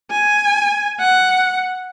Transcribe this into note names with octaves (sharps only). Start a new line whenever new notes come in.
G#5
F#5